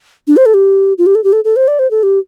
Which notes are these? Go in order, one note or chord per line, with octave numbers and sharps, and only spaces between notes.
D4
C5
A4
G4
F4
G4
A4
G4
A4
A4
C5
D5
C5
A4
G4